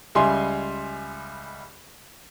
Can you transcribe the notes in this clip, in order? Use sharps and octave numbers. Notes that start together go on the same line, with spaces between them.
C#2 G3 E4 G#5 C6